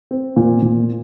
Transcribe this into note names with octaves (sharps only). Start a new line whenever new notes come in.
C4
A#2
A#2